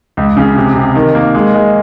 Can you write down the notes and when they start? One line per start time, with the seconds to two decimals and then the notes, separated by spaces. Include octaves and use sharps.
0.17 C#2
0.37 C#3
0.56 C3
0.75 C3
0.95 D#3
1.15 A#3
1.35 G#3
1.54 G#3